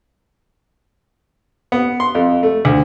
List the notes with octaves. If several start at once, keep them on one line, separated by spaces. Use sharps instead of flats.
B3
C6
F2
A3
D2